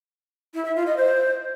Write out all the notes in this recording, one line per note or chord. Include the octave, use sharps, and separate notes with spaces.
E4
E5
F4
D#5
C5